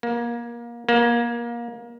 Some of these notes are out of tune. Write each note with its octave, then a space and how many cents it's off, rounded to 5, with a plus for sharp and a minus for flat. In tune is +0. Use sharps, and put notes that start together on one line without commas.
A#3 +25
A#3 +25